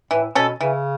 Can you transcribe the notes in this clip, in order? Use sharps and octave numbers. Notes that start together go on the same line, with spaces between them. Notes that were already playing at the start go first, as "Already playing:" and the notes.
A2 E3
B2 C#4 A4
C#3 E3